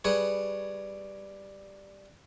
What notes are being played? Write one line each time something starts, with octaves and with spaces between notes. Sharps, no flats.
G3 G#4 B4 C#5